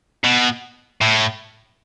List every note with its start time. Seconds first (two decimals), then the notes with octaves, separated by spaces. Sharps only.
0.24 B2
1.01 A2